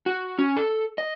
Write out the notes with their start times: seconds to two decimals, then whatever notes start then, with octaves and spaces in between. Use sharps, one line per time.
0.06 F#4
0.38 C#4
0.57 A4
0.98 D#5